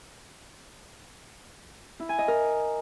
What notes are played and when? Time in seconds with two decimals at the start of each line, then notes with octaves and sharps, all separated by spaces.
2.00 E4
2.09 G#5
2.19 D#5
2.28 A#4